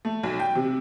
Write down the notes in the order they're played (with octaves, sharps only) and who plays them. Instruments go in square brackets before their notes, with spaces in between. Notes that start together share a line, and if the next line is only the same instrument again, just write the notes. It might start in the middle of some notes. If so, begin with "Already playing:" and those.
[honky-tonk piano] A3
B1
G5
C3